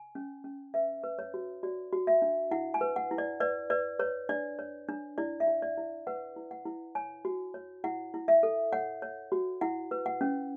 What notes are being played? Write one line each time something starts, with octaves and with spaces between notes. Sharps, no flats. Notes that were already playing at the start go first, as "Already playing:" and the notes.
Already playing: G#5
C#4
C#4
B4 E5
B4
C#5
F#4
F#4 D5
F#4
E5
D4
E4 F#5
G#5
B4
F#5
E4
D5
B4 D5
B4 D5
B4 C#5
D4 D5
C#5
D4
E4 D5
E5
E4
D5
E4
B4 F#5
E4
F#5
E4
C#5 G#5
F#4
C#5
E4 F#5
E4
E5
A4
C#5 F#5
C#5
F#4
E4 F#5
B4
F#5
C#4